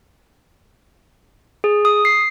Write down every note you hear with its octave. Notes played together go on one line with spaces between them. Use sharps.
G#4
D#6
C7